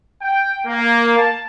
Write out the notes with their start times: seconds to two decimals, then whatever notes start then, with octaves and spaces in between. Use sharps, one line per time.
0.22 G5
0.66 A#3
1.17 A5